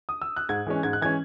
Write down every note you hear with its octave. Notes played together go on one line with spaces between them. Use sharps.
D#6
E6
F#6
G#2 G#6
E3 G#3 C#4
G#2 G#6
F#6
E3 G#3 C#4 G#6